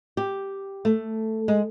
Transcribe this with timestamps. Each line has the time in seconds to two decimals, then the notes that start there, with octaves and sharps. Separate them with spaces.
0.17 G4
0.85 A3
1.48 G#3